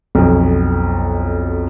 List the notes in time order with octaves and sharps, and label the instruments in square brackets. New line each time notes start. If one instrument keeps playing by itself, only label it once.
[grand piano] B1 F2